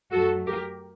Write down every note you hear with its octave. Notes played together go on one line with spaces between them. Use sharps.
F#2 F#3 A3 F#4 A4
G4 A#4